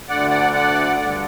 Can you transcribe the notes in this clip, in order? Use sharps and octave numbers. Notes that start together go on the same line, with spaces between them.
D2 D3 D5 F#5
D5 F#5
D5 F#5
G2 D3 D5 F#5